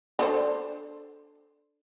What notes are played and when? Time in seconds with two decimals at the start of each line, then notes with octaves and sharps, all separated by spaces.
0.19 D4 A4 C5